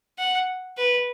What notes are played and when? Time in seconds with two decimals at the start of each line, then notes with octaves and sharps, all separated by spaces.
0.19 F#5
0.77 B4